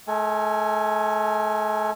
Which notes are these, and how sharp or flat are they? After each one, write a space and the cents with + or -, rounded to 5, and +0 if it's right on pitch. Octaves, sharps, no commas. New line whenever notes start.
A3 -45 A4 +35 G#5 +0